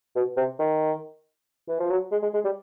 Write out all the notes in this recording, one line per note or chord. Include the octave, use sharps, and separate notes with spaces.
B2
C3
D#3
E3
F3
F#3
G#3
G#3
G#3
G3